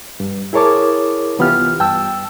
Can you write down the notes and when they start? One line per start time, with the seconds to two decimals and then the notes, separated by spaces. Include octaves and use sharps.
0.20 G2
0.53 E4 G#4 A#4 C#5 A5 D6
1.39 C2 E3 B3 F4 G4 F6
1.80 G2 G5 A5 E6